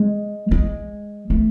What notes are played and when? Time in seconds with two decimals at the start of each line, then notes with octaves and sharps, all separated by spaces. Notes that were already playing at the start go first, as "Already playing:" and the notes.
Already playing: G#3
0.51 G#3
1.30 A3